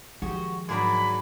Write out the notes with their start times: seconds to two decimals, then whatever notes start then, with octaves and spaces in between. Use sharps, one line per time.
0.22 D#3 F3 G#3 F#4 G4
0.69 G#2 F#3 G#3 A#3 D4 F#4 G#5 B5